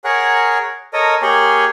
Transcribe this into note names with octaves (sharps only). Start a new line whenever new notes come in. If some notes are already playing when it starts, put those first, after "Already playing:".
G#4 A#4 C#5 F#5
A4 A#4 C#5 D#5
A#3 G4 G#4 C#5